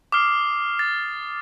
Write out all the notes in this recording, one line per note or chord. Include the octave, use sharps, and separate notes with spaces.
D6 D#6 F6 C7
A6